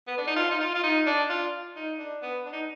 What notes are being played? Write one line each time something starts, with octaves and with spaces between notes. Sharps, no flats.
B3
D4
D#4
F4
D#4
F4
F4
D#4
D4
F4
D#4
D4
B3
D4
D#4